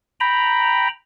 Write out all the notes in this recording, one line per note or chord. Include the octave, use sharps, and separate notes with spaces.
G5 A#5 B5